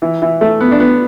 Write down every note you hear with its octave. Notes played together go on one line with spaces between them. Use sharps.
E3
E3
A3
B3
D4
B3